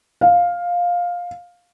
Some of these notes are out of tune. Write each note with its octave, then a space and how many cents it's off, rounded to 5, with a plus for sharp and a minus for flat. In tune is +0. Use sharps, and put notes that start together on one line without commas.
F5 +10